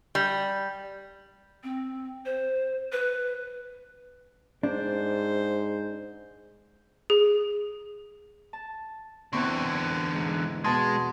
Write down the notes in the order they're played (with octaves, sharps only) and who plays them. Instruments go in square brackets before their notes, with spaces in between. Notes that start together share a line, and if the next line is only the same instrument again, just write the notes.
[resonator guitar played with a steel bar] G3
[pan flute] C4
C5
B4
[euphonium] G#2 [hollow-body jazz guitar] D4 [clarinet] C5
[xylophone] G#4
[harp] A5
[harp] E2 C4 C#6 [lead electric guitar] D3 E3
[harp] G#2
[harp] B2 A5 C6 [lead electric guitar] G#3